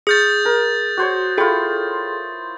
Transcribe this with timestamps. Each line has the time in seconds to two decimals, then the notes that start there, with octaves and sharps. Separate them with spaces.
0.07 G#4 D#6 F6 G6 A6
0.45 A#4
0.97 F#4 C5 C#5
1.38 E4 F4 G#4 A4 G5